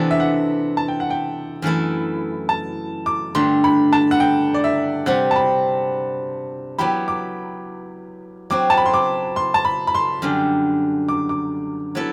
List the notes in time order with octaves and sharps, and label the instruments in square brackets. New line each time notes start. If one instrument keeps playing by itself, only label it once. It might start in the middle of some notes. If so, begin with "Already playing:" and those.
Already playing: [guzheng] C3 E3 B3 D4 A4
[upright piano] E5
F#5
A5
G5
F#5
G5
[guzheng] F#2 E3 A3 E4
[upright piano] A5
D6
[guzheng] G2 D3 A3 [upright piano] C6
[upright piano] B5
A5
F#5
G5
D5
E5
[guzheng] C3 G3 C4 [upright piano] F#5
[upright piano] A5
B5
[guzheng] F#3 B3 E4 G4 [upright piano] B5
[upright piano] D6
[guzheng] F#3 C4 F#4 [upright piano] D6
[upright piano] A5
B5
C6
D6
C6
A5
B5
B5
C6
[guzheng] F#2 D3 G3
[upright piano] D6
D6
[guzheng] F#3 B3 E4 A4